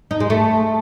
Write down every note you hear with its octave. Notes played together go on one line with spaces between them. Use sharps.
D#4
G#3
A3